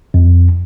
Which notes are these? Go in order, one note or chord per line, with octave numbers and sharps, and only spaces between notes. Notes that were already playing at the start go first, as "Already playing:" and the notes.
F2